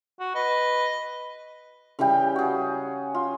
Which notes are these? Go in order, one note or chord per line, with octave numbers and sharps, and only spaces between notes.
F#4
B4 D#5
C#3 E3 G3 G5
F#4 G#4
F4